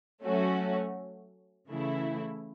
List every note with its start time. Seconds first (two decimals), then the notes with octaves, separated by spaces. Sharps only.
0.23 F#3 A3 C#4 F#4
1.67 C#3 E3 A3 E4